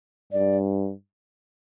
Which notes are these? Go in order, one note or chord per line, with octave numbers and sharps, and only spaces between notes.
G2 D5